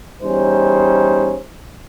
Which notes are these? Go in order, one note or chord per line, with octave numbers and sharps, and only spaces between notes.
E2 G3 C#4 D#4 C5